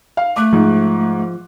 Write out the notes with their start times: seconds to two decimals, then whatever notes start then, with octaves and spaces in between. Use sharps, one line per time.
0.17 F5
0.36 A3 D6 F#6
0.53 G#2 F3